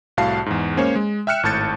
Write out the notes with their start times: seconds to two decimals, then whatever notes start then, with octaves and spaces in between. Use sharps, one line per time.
0.17 C2 A2 F#4 F5 A5 C7
0.46 E2 G#2
0.77 G#3 A#3 C#4 C5 C#5
0.96 G#3
1.27 E5 G5 F6 F#6 C#7 E7
1.43 G#1 A2 A5 G6 A6 C#7